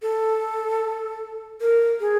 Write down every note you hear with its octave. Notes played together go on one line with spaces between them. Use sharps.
A4
A#4
G#4